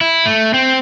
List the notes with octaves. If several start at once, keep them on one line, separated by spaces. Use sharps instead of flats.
E4
A3
C4